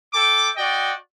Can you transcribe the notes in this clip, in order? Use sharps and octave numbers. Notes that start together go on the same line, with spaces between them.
A4 G5 D6
F#4 D5 D#5 G5